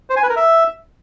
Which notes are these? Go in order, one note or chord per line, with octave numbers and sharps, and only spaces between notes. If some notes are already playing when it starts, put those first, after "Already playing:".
C5
G#5
B4
A#4
E5